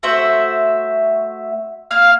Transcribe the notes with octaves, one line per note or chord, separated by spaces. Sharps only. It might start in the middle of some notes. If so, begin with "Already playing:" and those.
A3 F#4 C5 E5
A#3 F5 F6